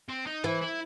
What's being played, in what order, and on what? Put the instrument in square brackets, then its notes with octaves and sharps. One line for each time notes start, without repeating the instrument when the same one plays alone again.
[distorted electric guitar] C4
D#4
[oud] E3 [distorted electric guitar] E4
[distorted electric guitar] E4